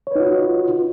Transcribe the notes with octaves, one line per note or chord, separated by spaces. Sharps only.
D#4 F4 F#4 B4 C#5